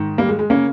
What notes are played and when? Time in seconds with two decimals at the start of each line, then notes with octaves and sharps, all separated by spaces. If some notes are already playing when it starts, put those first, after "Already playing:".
Already playing: G#2 D#3
0.18 G3 A#3
0.29 G#3
0.39 G#3
0.50 C#3 A#3 C#4